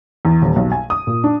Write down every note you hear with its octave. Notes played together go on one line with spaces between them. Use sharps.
E2
D#1
B1
G#5
D#6
A#2
D4